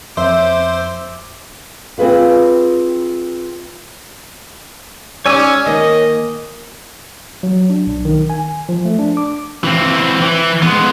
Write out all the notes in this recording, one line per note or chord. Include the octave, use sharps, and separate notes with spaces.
F2 C5 E5 D6
C4 F4 G#4 B4 F5
G3 C#4 D#4 C#5 D5 G#5 E6
D#3 A#3 D#5
F#3
D4
B1
D#3
G#5
F3
A3
D4
D6
E3 C4
E3
G#3 B3